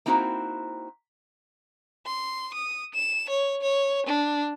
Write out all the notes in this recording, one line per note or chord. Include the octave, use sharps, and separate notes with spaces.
A#3 C4 D#4 E4 F#4 C5
C6
D#6
E7
C#5
C#5
D4